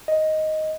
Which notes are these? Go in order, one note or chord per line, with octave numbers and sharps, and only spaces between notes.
D#5